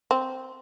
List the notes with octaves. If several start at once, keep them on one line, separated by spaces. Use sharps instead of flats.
C4